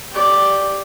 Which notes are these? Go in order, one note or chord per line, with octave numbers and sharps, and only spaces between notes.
G4 D5